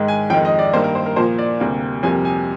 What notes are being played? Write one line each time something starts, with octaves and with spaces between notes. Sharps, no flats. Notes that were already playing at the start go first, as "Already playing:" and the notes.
Already playing: G#2 D#3 G#3
G#5
F2 D#3 G#3 G5
D#5
D5
G2 D#3 A#3 C5
A#4
C5
A#4
A#2 F3 A#3 C5
D5
D2 C3 G3 A#3
F2 C3 G3 A#3 G#5
G#5